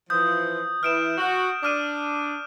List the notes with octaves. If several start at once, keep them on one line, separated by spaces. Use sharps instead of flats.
E3 F3 D#6 G6
E3 F6 D7 E7
F#4
D4 D6 F6 D#7